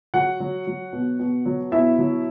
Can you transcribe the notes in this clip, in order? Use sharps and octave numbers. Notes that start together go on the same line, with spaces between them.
F#3 F#4 F#5
F#3
F#3
B2
B2
F#3
B2 E4 E5
F#3